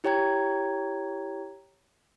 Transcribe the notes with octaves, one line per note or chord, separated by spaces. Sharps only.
E4 G4 C#5 G5 A#5 G#6